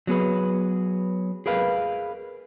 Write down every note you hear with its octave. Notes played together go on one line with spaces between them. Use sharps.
F#3 B3 G#4 B4
G#4 A#4 B4 F5